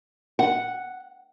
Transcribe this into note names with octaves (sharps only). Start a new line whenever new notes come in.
F#5